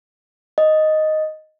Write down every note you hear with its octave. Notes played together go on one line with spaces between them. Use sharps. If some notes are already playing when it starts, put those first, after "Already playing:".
D#5